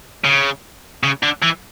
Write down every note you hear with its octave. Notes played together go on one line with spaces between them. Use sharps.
C#3
C#3
D3
E3